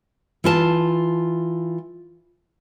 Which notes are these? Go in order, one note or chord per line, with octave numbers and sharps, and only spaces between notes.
E3 F4 A5